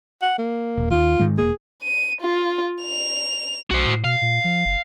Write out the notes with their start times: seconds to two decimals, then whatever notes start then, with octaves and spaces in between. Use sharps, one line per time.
0.22 F#5
0.38 A#3
0.78 D#1
0.91 D#2 F4
1.20 G#2 D#3 G#3
1.38 E1 A#3 G#4
1.83 D#7
2.21 F4
2.83 F7
3.71 B1 F#4 C5
3.87 A2
4.04 B2 F5
4.22 A#2
4.44 F3
4.65 F#1